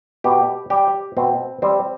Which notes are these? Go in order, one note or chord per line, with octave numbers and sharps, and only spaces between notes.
B2 G4
G3 G4
B2 C4
G3 C4